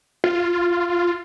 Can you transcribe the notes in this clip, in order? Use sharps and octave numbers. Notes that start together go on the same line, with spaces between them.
F4